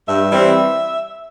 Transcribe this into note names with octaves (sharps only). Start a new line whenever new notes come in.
G2 E5
E3 G3 C4